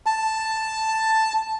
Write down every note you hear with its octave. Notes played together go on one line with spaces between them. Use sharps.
A5